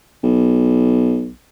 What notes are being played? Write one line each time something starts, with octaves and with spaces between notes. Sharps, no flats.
B1